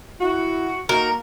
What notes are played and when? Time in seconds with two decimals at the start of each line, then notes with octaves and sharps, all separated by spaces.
0.21 E4 F#4
0.89 A#3 D#4 F#4 A#4